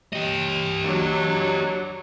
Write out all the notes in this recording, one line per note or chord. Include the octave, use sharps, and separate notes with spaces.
G4 D#5
F#3 D4